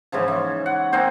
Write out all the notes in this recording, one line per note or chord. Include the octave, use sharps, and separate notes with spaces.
G#2 C#3 E3 F3
E3
F#5
A#3 C4 D#4 C5